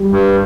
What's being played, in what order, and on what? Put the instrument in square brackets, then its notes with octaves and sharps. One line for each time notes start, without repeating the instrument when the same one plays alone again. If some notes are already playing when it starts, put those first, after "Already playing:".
Already playing: [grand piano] G3
[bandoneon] G2